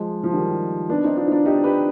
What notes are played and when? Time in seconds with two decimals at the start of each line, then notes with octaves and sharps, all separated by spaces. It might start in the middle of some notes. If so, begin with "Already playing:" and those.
Already playing: F3 G#3
0.24 F3
0.33 D#3 G3
0.89 B3 D4
1.04 C4 D#4
1.17 D4 F4
1.27 D#4
1.32 D4 F4
1.45 D#4 G4
1.64 G4 B4